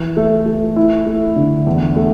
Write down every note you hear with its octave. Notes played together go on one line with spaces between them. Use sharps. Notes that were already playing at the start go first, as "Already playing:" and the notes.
Already playing: E3
A3
A3
E4
A3
D3
E2
A3